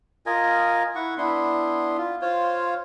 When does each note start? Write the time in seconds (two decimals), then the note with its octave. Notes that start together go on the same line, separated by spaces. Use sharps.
0.26 F4 A#4 D#5 G#5
0.96 E4 F#5 C#6
1.18 B3 D4 E4 C6
1.98 F4
2.22 F4 C5 C#5 F5